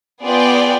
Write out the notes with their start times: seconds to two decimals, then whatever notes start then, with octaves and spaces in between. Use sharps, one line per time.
0.24 B3 F4 G#4 D5 G5